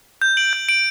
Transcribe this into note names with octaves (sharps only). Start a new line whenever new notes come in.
G6
D7 F#7
G6
D7 F#7